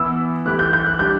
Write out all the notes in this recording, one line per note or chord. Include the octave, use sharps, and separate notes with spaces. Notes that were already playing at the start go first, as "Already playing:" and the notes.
Already playing: E3 B3 E4 E6
E3 A3 E4 G4 F#6
G6
G6
F#6
G3 D4 G4 G6